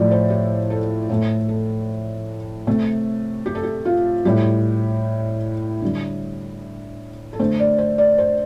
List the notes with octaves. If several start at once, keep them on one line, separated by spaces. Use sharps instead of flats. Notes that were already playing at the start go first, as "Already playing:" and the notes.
Already playing: A2 F3 A3 G4 A4 D5
C5
G4
A4
A2 A3 A4
A4
C3 A3
G4
A4
G4
F4
A2 G3 G4
D3 G3
A4
D3 A3 C5
D5
C5
D5
C5